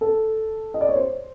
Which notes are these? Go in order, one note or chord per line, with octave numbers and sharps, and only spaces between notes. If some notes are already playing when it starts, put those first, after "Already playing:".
A4
D#5
D5
C#5
C5